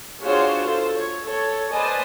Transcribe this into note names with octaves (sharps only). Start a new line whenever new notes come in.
D4 F4 F#4 G#4 C5 C#5
F4 A4 C5
C#5
A4 C#5
B4 C5 D5 D#5 G#5 A5